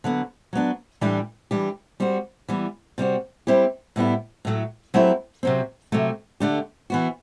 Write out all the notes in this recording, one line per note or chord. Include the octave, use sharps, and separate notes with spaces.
D3 F#3 B3
F#3 B3 D4
A2 E3 G3 D4 G4
E3 G3 D4 G4
G3 C4 F#4
E3 G3 B3
C3 G3 C4 F#4
G3 C4 E4 G4
A2 G3 B3 E4
A2 F#3 A3
F#3 A3 C4 E4 G4
C3 F#3 C4
C3 F#3 A3
D3 A3 D4 G4
E3 B3 F#4